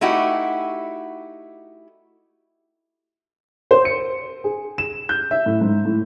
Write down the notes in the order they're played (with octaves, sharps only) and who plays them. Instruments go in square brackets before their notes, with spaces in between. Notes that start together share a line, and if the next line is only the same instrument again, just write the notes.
[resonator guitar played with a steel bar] A3 D#4 E4 F#4 G4
[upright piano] C5
C#7
G#4
E7
G6
E5
A2
G#2
A2